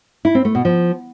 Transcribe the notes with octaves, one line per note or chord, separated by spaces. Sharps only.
E4
C4
A3
B2
F3